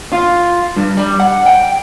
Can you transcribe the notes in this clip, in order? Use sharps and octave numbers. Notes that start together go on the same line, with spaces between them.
F4
G2
G3
F#5
G5